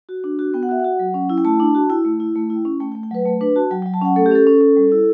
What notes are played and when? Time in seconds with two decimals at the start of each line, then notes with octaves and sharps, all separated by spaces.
0.09 F#4
0.24 D4
0.39 F#4
0.54 B3 G5
0.63 F#5
0.69 F#4 E5
0.80 F#4 F#5
0.99 F#3
1.14 C#4
1.29 E4
1.38 G5
1.45 A3 A5
1.60 D4
1.75 F#4 A5
1.90 E4 G5
2.05 A3
2.20 E4
2.35 A3
2.50 E4
2.65 C#4
2.80 A3 G5
2.92 G5
2.95 A3
3.03 G5
3.11 F#3 B4
3.26 A3
3.41 D4 B4
3.56 F#4 A5
3.71 F#3 G5
3.82 G5
3.86 F#3
3.94 A5
4.02 C#4 F#5
4.16 A3 A4
4.26 G4
4.31 C#4 A4
4.47 C#4
4.61 C#4
4.76 G3
4.92 E4